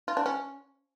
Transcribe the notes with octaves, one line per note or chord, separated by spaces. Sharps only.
F4
D4
C#4